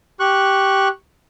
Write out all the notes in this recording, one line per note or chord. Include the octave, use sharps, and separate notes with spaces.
G4 C#6 F#6